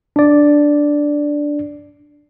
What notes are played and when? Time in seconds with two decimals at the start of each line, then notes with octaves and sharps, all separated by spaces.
0.16 D4 D5